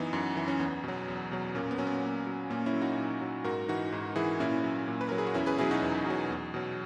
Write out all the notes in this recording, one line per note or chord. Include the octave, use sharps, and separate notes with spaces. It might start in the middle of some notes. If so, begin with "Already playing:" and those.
Already playing: F#2 E3 B3 D#4
F#2
E3
C#4
E2 B3
B2 F#3
E2
B2 F#3
A#2 A#3 C#4
B3
F#3 C#4
B3
A#2
F#3
A#2 A#3 C#4
C#4 E4
F#3
D#4 F#4
A#2
F#3
G#2 F#4 A#4
E3 D#4 F#4
G#2
E3 E4 G#4
A#2 C#4 E4
F#3
A#2
B4
F#3 A#4
G#4
F#4
E2 C#4 E4
G#4 B4
B2 F#3 E4 G#4
D#4 F#4
E2
B2 F#3
E2
B2 F#3